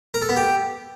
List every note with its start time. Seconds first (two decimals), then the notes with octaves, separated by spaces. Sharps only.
0.14 A#4
0.22 A4
0.29 B3
0.36 G4